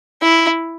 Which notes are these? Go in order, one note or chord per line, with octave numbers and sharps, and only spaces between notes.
E4